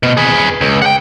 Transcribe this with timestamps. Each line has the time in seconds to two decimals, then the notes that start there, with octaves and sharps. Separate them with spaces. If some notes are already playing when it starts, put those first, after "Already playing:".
0.03 B2
0.17 G#4 B4
0.61 C#2
0.82 F#5 G5